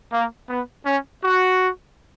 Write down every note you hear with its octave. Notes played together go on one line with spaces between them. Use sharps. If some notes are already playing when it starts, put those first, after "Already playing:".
A#3
B3
C#4
F#4